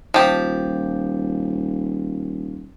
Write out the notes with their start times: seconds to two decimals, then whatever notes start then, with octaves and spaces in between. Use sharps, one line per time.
0.14 D#1 F3 G4